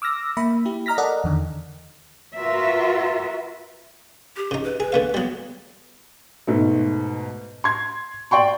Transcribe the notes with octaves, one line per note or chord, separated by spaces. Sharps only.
D6 E6 F6 A#6
A#3 E5 B5
E4 G4
D#5 A#5 F6 A#6 B6
A4 A#4 D5 D#5 F#5
E2 D3 D#3
F4 F#4 A#4 B4 E5
G4
C#3 D#4
B4
G#4 B4
D3 B3 F5
F#3 G3 B3
G#2 B2 A3
C6 G#6
D5 G5 C6 C#6